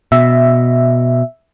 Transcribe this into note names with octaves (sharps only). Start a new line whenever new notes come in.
B2 E5